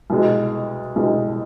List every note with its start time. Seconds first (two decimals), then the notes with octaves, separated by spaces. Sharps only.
0.10 C2 B2 G#3
0.96 C2 B2 G#3